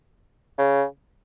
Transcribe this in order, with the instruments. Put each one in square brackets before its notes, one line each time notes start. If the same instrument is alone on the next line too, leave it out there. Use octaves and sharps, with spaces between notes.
[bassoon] C#3